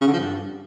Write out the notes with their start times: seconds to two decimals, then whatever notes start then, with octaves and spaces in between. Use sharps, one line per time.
0.01 C#3
0.07 D3
0.13 F3
0.19 G2